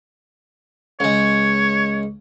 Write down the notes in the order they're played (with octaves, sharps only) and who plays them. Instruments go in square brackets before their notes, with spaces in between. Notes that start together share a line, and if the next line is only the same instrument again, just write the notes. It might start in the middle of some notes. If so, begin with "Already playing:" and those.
[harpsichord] C#2 G#3 [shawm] C#5